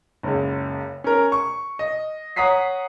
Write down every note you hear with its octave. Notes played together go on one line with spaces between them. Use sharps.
F#1 C#2
C#4 A#4
C#6
D#5
C#5 F#5 A#5 D#6 B6 C7